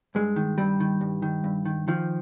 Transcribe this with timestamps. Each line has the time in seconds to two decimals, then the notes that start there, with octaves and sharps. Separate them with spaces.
0.15 G2 G#3
0.36 D#3
0.58 G2 G3
0.80 D#3
1.01 G2
1.22 D#3
1.44 G2
1.65 D#3
1.88 D#3 F3